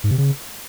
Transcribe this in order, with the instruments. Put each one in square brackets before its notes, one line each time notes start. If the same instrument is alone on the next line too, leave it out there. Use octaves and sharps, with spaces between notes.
[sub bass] G#2
C3
C#3